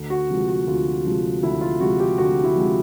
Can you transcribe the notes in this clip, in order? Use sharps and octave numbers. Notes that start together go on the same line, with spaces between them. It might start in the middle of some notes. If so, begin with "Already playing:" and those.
Already playing: D2
F#4
C3 F3 G#3
F#4
D2 F4
C3 F3 G#3
D2 E4
F4
C3 F3 G#3 F#4
G4
D2 F#4
E4
C3 F3 G#3